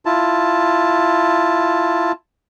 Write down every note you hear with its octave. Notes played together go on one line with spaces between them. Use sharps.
E4 F4 A5